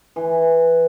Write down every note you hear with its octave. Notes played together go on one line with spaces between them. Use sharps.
E3